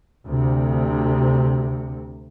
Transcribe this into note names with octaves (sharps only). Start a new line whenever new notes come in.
D2 C3